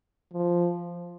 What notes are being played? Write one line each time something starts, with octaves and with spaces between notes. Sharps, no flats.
F3